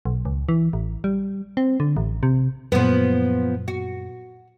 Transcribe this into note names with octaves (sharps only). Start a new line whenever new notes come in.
B1
C#2
E3
A1
G3
C4
D3
A1
C3
F#2 A#2 F3 B3
F#4